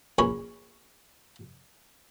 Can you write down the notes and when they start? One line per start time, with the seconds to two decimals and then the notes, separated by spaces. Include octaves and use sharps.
0.18 A#1 C#4 A#4 C#5 B5